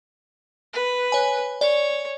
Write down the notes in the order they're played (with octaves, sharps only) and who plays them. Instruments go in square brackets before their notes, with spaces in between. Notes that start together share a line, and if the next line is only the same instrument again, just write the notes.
[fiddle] B4
[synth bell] C#5 G#5
[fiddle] C#5 [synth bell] D5